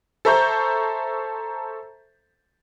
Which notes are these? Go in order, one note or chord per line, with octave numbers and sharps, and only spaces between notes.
A4 C5 E5 A#5 C#6 G6